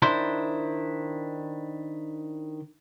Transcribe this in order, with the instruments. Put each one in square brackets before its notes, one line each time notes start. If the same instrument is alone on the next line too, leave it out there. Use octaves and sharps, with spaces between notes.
[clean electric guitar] D#3 D4 E4 C5